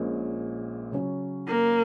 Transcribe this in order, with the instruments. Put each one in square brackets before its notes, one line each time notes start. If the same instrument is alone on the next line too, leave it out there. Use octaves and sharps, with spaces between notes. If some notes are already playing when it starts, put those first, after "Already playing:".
Already playing: [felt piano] A#1 A#2 G#3 C#4
C#3 F#3 C#4
[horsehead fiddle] A#3